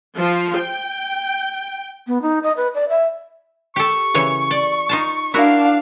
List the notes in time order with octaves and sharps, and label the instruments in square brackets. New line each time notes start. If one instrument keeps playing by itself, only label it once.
[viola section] F3
G5
[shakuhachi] B3
D#4
D#5
B4
D5
E5
[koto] G4 A4 [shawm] C#6
[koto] C#3 E3 C#5
D5
D#4 F4 A5
[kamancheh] D4 F5 [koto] E4 F#4 A#4